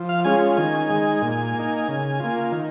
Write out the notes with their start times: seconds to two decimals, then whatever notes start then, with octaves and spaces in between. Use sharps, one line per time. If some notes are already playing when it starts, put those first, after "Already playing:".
Already playing: F3
0.09 F5
0.24 G#3 C#4 F4 G#5
0.57 D#3 G#5
0.89 G#3 D#4
1.22 A#2
1.55 A#3 D#4
1.88 C#3
2.19 A#3 F4
2.52 D#3